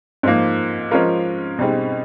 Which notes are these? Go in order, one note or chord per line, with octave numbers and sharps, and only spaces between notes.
G#2 F3 A#3
F3 G#3 C#4 F4 A#4
B2 G3 C4 D#4 G#4